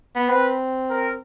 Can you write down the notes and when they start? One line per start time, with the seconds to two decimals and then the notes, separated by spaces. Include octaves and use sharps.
0.16 B3
0.28 C4 B4
0.90 A#4